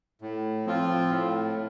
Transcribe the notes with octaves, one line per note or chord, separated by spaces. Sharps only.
A2
F3 C4 F4
A2